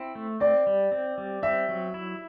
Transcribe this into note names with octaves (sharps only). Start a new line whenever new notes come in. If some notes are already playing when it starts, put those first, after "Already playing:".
Already playing: C4 E4
A3
C4 D5
G3
C4
G3
C4 E5
F#3
E4